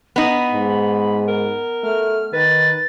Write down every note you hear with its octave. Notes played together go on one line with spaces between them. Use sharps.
B3 D#4 B5
G#2
A#4
A3 F6
D#3 B4 A6